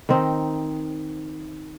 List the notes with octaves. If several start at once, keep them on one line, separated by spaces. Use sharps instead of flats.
D#3 C4 D#4